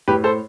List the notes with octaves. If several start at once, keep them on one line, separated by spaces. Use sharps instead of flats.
A2 G4 B4
A4 C5